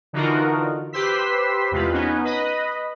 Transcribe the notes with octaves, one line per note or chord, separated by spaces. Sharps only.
D3 E3 D#4 F4 F#4 A#4
G4 B4 C5 C6 E6 B6
E2 C3 G#3 F4 B4
B3 C#4 D#4
B4 D#5 B5